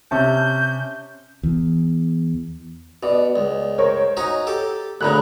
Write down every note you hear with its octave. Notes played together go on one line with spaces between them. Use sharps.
C3 C#4 A5 G6
E2
B2 D5
C#2
A#4 C5 C#5
C#4 D#4 F#4 A#5
G4 A4
D2 A#2 C#3 A#5 B5 F#6